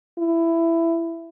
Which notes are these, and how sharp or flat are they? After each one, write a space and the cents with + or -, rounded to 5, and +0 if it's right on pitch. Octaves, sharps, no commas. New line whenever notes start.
E4 +15